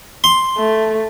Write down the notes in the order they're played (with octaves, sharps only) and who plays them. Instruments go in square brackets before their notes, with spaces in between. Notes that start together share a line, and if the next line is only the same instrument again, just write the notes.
[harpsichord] C6
[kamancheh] A3